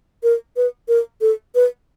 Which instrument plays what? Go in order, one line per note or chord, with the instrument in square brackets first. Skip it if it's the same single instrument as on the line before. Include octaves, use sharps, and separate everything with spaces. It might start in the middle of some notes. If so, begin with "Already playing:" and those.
[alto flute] A#4
B4
A#4
A4
B4